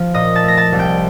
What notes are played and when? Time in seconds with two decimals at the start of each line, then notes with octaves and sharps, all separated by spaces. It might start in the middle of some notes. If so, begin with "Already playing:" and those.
Already playing: F3
0.14 A#2 D#5 D#6
0.35 A5 A6
0.43 A3 A#6
0.57 A5 A6
0.72 C2
0.79 G5 G6